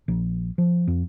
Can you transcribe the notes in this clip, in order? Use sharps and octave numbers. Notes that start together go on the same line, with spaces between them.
A#1
F3
F2